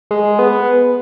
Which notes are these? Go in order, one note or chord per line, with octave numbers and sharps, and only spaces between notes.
G#3
B3